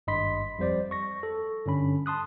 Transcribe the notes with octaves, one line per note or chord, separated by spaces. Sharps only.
G#1 G2 D#5 B5 C6 B6
F2 G3 C5 D5
C#6 A#6
A4
G2 D3 C#4 B5
A5 C6 D#6 F#6